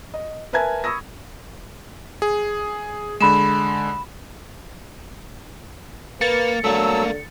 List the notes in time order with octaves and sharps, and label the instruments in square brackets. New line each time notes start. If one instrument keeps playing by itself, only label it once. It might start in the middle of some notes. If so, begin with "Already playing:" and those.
[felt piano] D#5
A#4 B4 E5 G#5 A5 G#6
B5 C#6 D#6 E6 A#6
[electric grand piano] G#4
[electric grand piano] D3 G#3 [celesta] B5 E7
[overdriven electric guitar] A#3 [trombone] B4 [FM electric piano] A6 C#7
[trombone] D3 [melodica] F#3 A4 E6 [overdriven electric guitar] A3 A#3